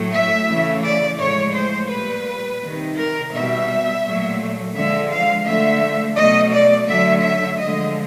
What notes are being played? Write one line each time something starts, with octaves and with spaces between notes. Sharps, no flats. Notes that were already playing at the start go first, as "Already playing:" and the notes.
Already playing: A2 F#3 A3
E5
C#3 E3 A3
D5
A2 F3 G#3 C#5
C5
A#2 G3 B4
C3 D#3 G3
A#4
B2 G3 E5
A#2 F#3 A3
D3 F3 G#3 E5
F5
D3 F3 A3 E5
B2 F#3 A3 D#5
D5
D3 F#3 A3 E5
E5
D3 F3 G#3 D#5